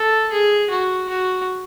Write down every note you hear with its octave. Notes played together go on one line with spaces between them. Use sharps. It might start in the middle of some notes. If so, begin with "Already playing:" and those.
Already playing: A4
G#4
F#4
F#4